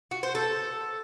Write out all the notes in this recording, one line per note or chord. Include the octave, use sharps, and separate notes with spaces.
F#4
C5
A4